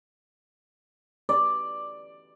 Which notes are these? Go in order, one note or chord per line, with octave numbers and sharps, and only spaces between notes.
D5